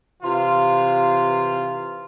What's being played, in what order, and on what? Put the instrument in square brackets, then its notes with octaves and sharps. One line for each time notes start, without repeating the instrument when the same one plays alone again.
[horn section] C3 E3 F4